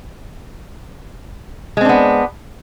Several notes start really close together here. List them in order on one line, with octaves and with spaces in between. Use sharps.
G#3 C4 D4 B3